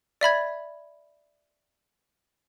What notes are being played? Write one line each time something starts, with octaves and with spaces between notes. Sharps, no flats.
D5 E5 B5 G#6